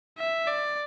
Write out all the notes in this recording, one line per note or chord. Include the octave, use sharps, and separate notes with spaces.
E5
D5